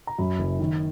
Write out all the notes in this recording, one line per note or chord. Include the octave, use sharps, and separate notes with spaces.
A#5
F#2 B5
F#1
D#3